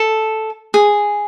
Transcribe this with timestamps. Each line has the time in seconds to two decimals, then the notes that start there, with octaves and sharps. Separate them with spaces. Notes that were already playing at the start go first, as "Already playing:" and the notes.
Already playing: A4
0.74 G#4